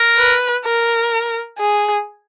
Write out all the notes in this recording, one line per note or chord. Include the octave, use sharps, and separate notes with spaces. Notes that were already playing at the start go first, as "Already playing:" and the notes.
Already playing: A#4
B4
A#4
G#4